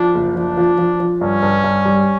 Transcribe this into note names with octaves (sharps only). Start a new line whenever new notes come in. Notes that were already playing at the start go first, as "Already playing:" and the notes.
Already playing: F3 D4
F#1
F3 D4
F3
F3
F3
G2 C#4
G2
G2
G3